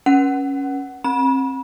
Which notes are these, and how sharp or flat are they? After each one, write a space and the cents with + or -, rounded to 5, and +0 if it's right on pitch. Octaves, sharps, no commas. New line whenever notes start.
C#4 +0 B4 -35 F#5 +15
C4 +35 B5 -35